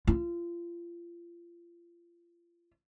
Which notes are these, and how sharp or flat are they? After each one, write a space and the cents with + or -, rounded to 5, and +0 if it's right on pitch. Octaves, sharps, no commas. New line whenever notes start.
F4 -30